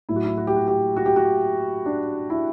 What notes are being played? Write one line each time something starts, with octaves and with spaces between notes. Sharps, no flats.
A2 F#3 E4
F#4
E4
F#4
G4
F#4
G4
F#4
G4
F#4
D4
E4